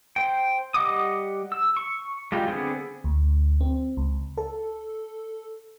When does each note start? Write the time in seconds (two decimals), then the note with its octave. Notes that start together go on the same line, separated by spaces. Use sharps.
0.16 C5 G5
0.74 G3 D#5 F#5 D6 D#6
1.52 E6
1.77 C#6
2.32 G3 G#3 F4 G4
2.48 D3 B3 C4 G#4
3.04 D2
3.61 C4
3.97 C#2
4.37 A4